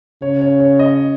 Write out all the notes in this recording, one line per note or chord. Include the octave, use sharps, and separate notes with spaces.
C#3 C#5
C#5
C#5
D#5